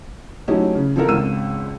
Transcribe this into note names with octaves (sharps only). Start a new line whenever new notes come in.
F#3 A3 C#4 D#4 E4 G4
C#3
F3 C4 E4 A4 A#4
G#1 C#2 E6 D#7